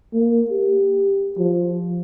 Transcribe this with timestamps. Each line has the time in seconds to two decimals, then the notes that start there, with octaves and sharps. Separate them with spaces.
0.13 A#3
0.51 G4
1.38 F3